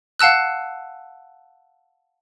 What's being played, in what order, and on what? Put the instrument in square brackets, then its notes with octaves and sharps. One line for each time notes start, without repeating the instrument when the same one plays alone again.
[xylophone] F5 F#5 A5 E6 F#6